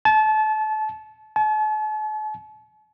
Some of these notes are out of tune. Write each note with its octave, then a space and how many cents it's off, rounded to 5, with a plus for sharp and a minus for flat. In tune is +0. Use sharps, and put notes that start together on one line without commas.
A5 -30
A5 -45